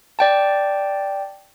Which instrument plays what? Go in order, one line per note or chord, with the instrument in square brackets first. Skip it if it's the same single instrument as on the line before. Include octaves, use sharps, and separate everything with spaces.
[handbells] D5 G5 A5